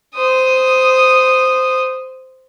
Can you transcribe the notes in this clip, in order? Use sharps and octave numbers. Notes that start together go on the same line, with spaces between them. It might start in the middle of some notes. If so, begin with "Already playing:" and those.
C5 D#6